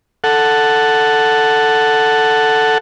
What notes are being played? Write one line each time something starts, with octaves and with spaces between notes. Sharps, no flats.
A4 F#5